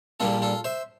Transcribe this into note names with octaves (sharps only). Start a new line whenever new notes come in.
A#1 A#2 G3 A#3 D4 F4 A4
F4 A4
C5 E5